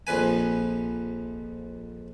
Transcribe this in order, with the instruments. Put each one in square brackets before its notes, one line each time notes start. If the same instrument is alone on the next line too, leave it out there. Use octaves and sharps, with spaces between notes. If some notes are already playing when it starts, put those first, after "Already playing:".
[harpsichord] A#1 F2 B4 G#5